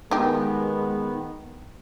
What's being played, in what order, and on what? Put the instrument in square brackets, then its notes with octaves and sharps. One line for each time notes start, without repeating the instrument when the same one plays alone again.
[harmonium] D#3 B3 [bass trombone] G#3 [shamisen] D#4 G4